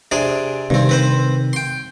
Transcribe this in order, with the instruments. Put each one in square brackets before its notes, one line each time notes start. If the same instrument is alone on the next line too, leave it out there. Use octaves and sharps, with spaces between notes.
[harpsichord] C3 D4 G#4
[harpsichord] G2 C4 [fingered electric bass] C3 D#3
[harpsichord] C4 B4 C5
G5 C6